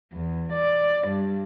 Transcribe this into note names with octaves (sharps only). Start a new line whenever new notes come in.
E2
D5
G2